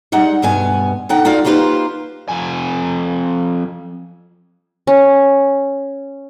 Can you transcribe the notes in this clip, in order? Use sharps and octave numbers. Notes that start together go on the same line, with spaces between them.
G3 G#3 D#4 F#5
D2 G2 B2 B3 G#5
D3 D#4 F#5 G5
D#4 F4 F#4 D5 F5
A#3 D#4 F4 G4 B4 C5
F2 G#5
C#4